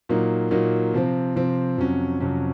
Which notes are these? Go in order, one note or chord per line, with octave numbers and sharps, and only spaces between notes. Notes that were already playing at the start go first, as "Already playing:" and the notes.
A#2 F#3 A#3 D#4
A#2 F#3 A#3 D#4
C3 F3 C4
C3 F3 C4
F2 C3 F#3 C#4
F2 C3 F#3 C#4